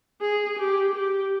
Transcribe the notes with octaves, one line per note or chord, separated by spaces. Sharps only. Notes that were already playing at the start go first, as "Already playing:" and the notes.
G#4
G4
G4